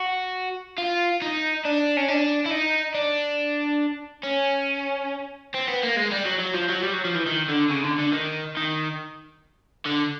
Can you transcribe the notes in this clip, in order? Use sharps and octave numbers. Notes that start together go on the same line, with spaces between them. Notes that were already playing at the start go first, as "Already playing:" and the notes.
Already playing: F#4
F4
D#4
D4
C#4
D4
E4
D#4
D4
C#4
C4
B3
A#3
G#3
G3
F#3
F#3
F3
F#3
G3
F#3
F3
E3
D#3
D3
C#3
D3
D3
D#3
D#3
D3